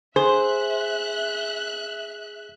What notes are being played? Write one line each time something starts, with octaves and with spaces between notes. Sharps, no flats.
G#4 C5 E5 F#6